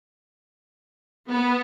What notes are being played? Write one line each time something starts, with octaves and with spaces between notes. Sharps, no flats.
B3